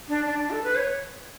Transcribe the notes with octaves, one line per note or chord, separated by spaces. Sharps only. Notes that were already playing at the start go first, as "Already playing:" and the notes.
D4
D4
D4
A4
B4
C#5